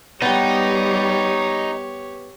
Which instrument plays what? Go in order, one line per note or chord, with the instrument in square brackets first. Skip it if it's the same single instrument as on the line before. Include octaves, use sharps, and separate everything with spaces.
[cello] G3 [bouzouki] B3 G5 [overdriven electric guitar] D#4 [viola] G4 C#5